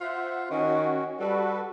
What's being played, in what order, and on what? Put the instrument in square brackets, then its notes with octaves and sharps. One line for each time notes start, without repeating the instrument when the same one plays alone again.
[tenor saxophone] F4 [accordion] C5 E5 F#5
[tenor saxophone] D#3 [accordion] C#4 F#4
[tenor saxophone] G3 [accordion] F#4 A4 B4